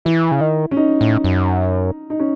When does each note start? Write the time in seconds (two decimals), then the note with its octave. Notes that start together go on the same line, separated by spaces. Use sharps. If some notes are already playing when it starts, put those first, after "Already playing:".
0.05 E3 E4
0.31 C#3
0.41 D#3
0.71 C#4
0.77 D#4
1.01 A2
1.24 F#2
2.10 D#4
2.20 C#4